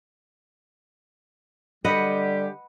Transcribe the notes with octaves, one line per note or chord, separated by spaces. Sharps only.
D3 G3 G4 B4 D#5 F#5